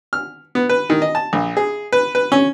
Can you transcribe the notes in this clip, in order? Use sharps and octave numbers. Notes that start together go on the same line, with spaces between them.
F6
B3
B4
D#3
D#5
A5
A#1
G#4
B4
B4
C#4